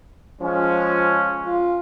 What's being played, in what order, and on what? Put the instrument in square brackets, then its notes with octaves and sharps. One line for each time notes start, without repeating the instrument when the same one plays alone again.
[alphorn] F3 [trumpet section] G#3 C#4
[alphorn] F4